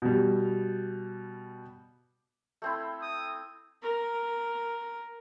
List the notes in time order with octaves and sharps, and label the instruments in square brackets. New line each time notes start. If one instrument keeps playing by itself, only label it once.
[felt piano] B2 G3
[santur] A3 C4 E4
[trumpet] D#6
[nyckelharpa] A#4